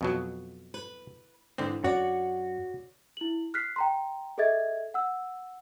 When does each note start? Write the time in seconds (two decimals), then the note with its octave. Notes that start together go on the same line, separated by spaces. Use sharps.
0.01 F2 B2 F#3
0.74 B4
1.58 G#2 D3 E3 C4
1.84 F#2 F#4 C#5 D5
3.17 E4 F#7
3.54 F6 F#6 B6 C7
3.76 G5 A#5 C6
4.38 G#4 A4 D#5 E5 G#6 A6
4.94 F#5 E6